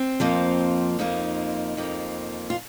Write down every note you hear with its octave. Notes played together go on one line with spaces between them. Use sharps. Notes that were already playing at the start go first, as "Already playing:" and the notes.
Already playing: C4
F2 F3 A#3
F2 F3 A#3 D#4
F2 F3 A#3
F4